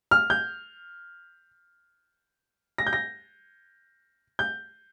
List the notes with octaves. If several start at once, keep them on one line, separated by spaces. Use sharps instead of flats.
F6
G6
A#6
G6
A#6
G6